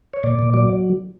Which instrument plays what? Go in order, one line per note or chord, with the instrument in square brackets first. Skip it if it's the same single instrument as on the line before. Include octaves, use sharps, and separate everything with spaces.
[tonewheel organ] C#5
A#2 D5
A#2
F#3 D5